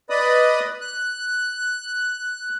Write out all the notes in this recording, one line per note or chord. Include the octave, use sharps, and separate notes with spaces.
B4 D5 D#5 B5 D#6
F#6